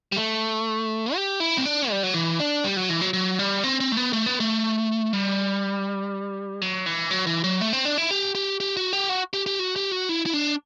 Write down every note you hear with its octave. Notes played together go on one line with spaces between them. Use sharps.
G3
A3
G4
E4
C4
D4
G3
F#3
E3
D4
G3
F#3
E3
F#3
F#3
G3
C4
C4
A3
B3
A3
B3
A3
G3
F#3
E3
F#3
E3
F#3
A3
C4
D4
E4
G4
G4
G4
F#4
G4
F#4
G4
G4
F#4
G4
F#4
E4
E4
D4